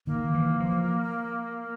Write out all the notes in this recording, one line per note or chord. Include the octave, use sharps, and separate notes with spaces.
D#3 A#3
E3
F3